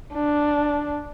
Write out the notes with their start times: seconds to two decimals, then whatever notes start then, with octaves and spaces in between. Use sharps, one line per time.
0.14 D4